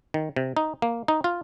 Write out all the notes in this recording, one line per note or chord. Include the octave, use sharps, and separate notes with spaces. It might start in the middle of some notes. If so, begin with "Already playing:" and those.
D#3
C3
D#4
A#3
D#4
F4